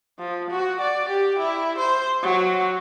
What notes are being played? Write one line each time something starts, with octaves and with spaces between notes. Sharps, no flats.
F3
F#4
D5
G4
E4
C5
F#3